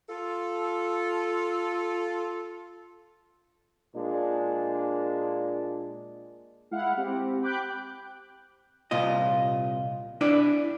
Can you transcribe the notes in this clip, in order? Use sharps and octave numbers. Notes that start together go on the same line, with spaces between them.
F4 A4
A#2 G#3 D4
G#3 E4 F5 F#5
C4 G4
G5 B5 D6 F#6 G6
C2 A#2 F4 D#5
D4 E4 B4 D5